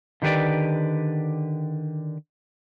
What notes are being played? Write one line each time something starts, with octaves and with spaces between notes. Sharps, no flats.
D3 D#3 G4 B4 D5